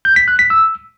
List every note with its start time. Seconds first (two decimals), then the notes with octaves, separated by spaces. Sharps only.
0.05 G6
0.16 B6
0.28 F#6
0.39 B6
0.50 E6